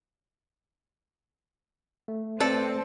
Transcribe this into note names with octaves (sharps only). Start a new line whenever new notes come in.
A3
C4 A4 B4 D5